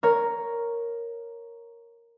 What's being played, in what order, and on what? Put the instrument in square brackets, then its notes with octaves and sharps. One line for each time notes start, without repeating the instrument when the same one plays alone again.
[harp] A#4 C#5